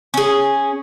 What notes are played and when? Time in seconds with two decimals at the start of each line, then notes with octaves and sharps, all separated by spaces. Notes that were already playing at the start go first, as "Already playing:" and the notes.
0.14 C#4 G#4